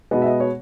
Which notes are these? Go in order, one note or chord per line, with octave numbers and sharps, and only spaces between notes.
B2 G#3 B3 D#5
E5
D#5
C#5